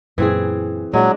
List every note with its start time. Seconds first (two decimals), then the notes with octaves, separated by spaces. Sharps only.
0.18 F#2 A#2 E3 C4 G#4
0.93 A#2 F#3 G#3 D4